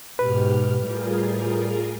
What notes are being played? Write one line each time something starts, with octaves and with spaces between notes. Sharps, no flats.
G#2 B2 G4 B4 F6
A2 G3 F4 G#4 A#4